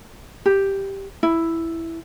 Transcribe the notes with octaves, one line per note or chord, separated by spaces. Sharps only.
G4
E4